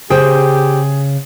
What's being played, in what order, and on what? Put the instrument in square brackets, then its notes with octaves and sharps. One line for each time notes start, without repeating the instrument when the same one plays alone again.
[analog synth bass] C#3 [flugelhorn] G4 [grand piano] G#4 [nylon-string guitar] C5 G5